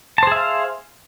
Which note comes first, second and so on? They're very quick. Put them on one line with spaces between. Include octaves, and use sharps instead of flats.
A5 C5 G#4 E5 F5